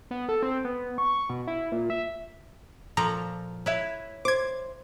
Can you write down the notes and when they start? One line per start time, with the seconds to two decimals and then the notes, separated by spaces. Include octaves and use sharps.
0.11 B3
0.29 A4
0.43 C4
0.65 B3
0.98 C#6
1.30 B2
1.47 E4
1.72 A#2
1.90 E5
2.97 A#2 F3 A4 A#5
3.66 E4 B4 C#5 E5
4.25 C5 D6 G#6